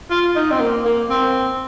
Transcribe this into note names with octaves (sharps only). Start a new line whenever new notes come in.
F4
D#4
C4
A#3
A#3
C4